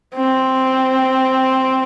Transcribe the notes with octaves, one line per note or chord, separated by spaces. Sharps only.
C4